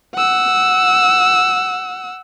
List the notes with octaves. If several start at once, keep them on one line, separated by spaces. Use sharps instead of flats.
F#5 E6